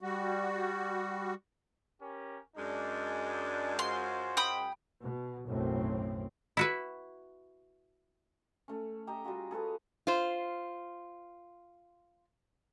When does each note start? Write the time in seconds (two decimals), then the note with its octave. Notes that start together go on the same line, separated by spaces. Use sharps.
0.01 G3 F#4
2.02 C#4 G4 A#4
2.57 F#2 G#3 D4
3.79 F4 F#4 C5 C6
4.37 G5 B5 D#6
5.01 B2
5.47 B1 F#2 A2 C4
6.57 E4 F#4 B4
8.68 A3 C#4
9.07 G4 D#5 E5 A#5
9.24 G3 F4 F#4 G#4
9.51 G#4 A4 B4 C#5
10.07 F4 C5